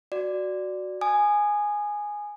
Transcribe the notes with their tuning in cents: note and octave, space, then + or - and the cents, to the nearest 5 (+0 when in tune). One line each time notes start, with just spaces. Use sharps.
F#4 +0 D5 +0
G#5 +0 D#6 -30